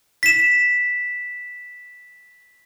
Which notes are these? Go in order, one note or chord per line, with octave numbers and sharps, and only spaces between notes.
B6 E7